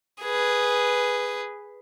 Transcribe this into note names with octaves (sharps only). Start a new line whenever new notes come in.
G#4 B4